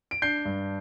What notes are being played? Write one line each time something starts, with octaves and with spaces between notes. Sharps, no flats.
D7
D4 G6 C7
G2